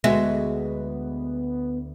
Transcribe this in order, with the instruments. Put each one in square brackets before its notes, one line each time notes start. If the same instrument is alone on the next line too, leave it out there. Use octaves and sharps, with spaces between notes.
[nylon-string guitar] D2 F#4 E5 [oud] G#3 [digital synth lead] B3